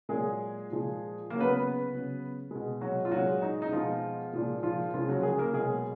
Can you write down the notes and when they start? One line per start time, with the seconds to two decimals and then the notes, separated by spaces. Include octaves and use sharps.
0.09 A#2 F#3 G#3 G#4
0.70 A#2 F3 G#3
1.30 C#3 F#3 A#3 A#4
1.39 B3 B4
1.50 B3 B4
1.90 C#3 F#3
2.51 B2 G#3
2.81 F#3 F#4
3.05 F4
3.12 A#2 F#3 G#3 F#4
3.42 D#4
3.62 D#4
3.72 B2 F3 G#3 F4
4.33 A#2 F3 G#3
4.63 F3 F4
4.94 C#3 F3 G#3 F4
5.09 F#3 F#4
5.23 G#3 G#4
5.38 A#3 A#4
5.53 B2 F#3 G#3 G#4